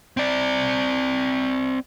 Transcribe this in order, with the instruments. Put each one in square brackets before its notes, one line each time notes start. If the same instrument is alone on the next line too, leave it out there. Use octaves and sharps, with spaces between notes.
[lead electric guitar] C4 D5